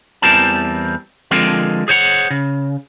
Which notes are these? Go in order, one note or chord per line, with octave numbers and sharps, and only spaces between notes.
E2 E3 G3 C4 A#4 A5
D3 F3 G#3 C4 A#4
G#4 C5 C#5 F#5
C#3